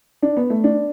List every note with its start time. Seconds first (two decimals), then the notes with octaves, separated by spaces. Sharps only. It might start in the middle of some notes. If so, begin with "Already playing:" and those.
0.22 D4
0.37 B3
0.50 A3
0.64 D4